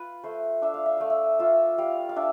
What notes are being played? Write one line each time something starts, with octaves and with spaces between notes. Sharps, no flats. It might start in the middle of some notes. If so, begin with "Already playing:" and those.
Already playing: F4 B4
A3 C5
D4 E5
F5
E5
A3 F5
E5
F4 E5
G3 F5
F5
D4 E5